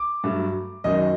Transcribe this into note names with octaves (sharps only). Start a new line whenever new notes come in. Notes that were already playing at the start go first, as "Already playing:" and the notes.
Already playing: D6
G2 F#3 A3
F#2 D#3 F#3 D#5